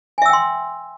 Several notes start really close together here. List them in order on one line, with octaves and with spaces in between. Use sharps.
G#5 E5 E6 G5 C6